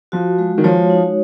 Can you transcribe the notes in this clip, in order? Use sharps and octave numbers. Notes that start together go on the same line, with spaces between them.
F3 F#4
G#3
D#3
F3 C#5
D#4